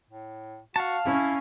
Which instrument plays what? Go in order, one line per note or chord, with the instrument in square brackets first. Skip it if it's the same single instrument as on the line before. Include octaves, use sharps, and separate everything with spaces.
[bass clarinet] A2
[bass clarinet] F#4 [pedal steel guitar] F5 A5
[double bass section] C#4 [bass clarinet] E4